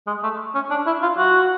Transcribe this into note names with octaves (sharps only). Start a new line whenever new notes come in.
G#3
A3
C#4
D4
E4
F4
F#4